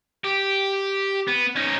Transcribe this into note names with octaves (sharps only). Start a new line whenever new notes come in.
G4
B3
C#4 D#4